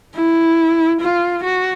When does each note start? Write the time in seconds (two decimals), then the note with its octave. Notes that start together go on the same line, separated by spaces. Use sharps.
0.15 E4
1.01 F4
1.43 F#4